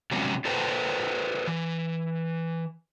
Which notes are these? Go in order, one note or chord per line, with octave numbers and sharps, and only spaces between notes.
C3 F3 F#3 G#3 B3 C#4
F4 A4 B4 C5 G5 A5
E3